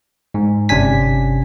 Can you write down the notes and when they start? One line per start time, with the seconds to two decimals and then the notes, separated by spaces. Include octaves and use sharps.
0.34 G#2
0.69 G1 C3 C#4 D4 G#5 B6